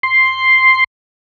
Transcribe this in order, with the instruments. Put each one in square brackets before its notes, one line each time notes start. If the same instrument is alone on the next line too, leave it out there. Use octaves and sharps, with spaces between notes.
[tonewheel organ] C6